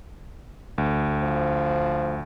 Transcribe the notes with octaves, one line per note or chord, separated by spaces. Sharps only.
D2
F3